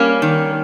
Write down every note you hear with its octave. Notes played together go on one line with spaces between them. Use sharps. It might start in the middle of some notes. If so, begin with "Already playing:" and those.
Already playing: G3 A#3 C#4
D#3